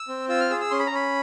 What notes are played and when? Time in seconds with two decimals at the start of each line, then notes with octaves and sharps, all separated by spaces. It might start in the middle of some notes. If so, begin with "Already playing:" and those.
Already playing: E6
0.08 C4
0.29 F4 E6
0.40 F6
0.50 G#4 E6
0.61 E6
0.71 C#4 C6
0.79 B5
0.87 A#5
0.91 C#4 B5